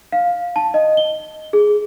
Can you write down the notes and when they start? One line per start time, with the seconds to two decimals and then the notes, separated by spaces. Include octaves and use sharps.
0.12 F5
0.56 A5
0.74 D#5
0.97 G7
1.53 G#4